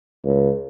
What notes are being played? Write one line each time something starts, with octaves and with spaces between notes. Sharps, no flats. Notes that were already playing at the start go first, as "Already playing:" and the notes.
C#2